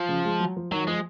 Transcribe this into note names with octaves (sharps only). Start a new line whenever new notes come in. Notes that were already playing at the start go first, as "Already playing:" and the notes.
Already playing: F3
C#3
G#3
F#3
F3
D#3 F#3
F3 G#3